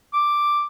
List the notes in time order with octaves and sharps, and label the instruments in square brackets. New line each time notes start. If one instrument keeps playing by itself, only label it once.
[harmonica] D6